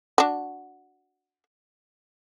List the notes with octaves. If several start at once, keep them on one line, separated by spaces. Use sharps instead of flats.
D4 F#4